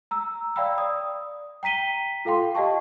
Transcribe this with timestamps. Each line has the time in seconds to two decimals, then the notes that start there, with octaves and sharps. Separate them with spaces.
0.11 A#5 E6
0.56 D5 F5 G5 B5 E6
0.78 D5 D#6
1.63 G5 A#5 B6 D#7 G7
2.25 F4 A4 F5 G5 C6
2.55 G4 D#5 F5 G5 A5 C#6